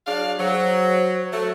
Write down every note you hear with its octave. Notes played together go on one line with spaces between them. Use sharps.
F#3 D4 G#4 F5
F#3 C5
F#3 A3